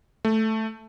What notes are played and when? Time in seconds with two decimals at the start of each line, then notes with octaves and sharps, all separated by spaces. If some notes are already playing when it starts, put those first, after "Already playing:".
0.25 A3